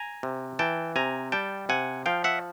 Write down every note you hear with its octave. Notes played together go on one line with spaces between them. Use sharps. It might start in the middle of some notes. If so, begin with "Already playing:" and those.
Already playing: G#5 A#5
C3
E3 G5 A5
C3 G#5 A#5
G3 G5 A5
C3 F#5 G#5
F3 F5 G5
E5 F#5